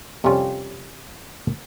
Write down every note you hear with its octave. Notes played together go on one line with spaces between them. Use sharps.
F2 C3 G3 C#4 F4